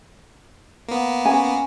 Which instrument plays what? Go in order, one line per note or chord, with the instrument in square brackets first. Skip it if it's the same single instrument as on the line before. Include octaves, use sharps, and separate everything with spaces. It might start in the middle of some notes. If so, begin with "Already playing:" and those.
[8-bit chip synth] A#3 B3
[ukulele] C#4 G#5